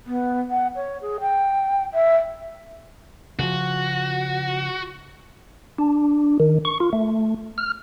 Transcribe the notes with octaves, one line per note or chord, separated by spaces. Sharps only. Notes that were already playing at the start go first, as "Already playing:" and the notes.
B3
F#5
C#5
G#4
G5
E5
C#3 F3 F#4
D4
D#3
C#6
F4
A3
F6